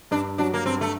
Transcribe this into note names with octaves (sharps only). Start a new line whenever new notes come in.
G2 D4
F#3 D4
A#3
G2 C4
A3